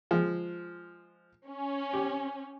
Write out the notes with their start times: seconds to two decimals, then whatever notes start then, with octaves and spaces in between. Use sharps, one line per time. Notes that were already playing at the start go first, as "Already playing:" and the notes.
0.11 F3 G#3
1.48 C#4
1.93 G4